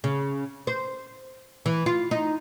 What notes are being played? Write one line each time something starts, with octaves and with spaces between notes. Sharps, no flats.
C#3
C5
E3
F4
D#4